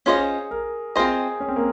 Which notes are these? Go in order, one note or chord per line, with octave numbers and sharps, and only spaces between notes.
C#4 F4 G#4 C5 D#5
A#4
C4 F4 G#4 C5 D#5
C#4
C4
A#3